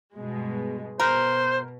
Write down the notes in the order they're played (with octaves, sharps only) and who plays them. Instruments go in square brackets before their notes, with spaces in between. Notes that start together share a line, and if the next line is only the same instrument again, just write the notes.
[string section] G2 B2 G#3
[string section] B2 [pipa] A#4 [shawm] C5